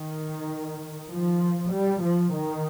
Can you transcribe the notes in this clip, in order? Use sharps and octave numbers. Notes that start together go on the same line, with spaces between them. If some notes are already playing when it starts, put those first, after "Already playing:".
Already playing: D#3
F3
G3
F3
D#3